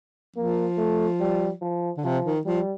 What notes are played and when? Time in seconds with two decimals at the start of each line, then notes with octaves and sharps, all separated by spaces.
0.36 F3 A#3
0.77 A3
1.20 G3
1.61 F3
1.97 D3
2.04 C3 F3
2.25 D#3
2.45 F3 G3